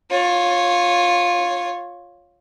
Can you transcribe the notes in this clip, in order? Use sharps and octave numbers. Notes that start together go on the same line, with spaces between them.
F4 C#5